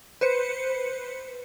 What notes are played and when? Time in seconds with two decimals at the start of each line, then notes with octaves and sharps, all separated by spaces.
0.21 B4 C5 C#7